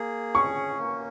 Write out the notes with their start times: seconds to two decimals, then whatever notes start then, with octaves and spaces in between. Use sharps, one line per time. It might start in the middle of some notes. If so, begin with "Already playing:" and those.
Already playing: A#3 G#4
0.35 C#4 C#6
0.78 A#3